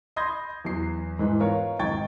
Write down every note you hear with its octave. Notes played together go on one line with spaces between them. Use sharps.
B5 C6 D#6 G6 G#6 A#6
E2 F#3 C7
G#2 E3
B3 F4 A#4 C#5
G#1 D#4 G5 C#6 G#6 A6